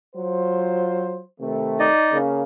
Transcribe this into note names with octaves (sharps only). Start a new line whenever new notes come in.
F#3 F4 C5
C3 D#3 A3
D#4 D5 D#5
C#3 A#3